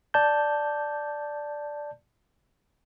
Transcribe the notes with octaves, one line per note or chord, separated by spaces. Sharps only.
D5 A5 G6